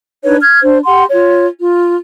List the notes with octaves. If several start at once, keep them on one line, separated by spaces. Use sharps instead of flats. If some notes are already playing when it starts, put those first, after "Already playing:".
D4 D#4 B4 C#5
F6 G#6
D4 C5
G4 F#5 C6
F4 C#5
F4